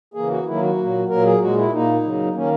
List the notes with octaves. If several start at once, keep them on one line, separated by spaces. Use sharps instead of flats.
C#3 E3 A#3 G#4
F#4
D#3 F#3 A#3 E4
F#4
A#2 F#3 A#3
A#2 F#3 A#3 A#4
G#4
A#2 G#3 F#4
E4
A#2 A#3 D#4
C#3 F#3 A#3
D#3 A#3 C#4